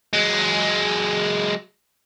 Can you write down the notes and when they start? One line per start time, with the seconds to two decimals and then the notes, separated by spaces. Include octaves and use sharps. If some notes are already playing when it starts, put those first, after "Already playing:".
0.13 F#3 G#3